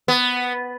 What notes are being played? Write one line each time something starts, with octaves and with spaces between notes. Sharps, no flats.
B3